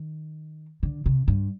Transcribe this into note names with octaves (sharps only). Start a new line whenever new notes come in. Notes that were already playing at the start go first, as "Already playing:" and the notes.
Already playing: D#3
D3
C3
G2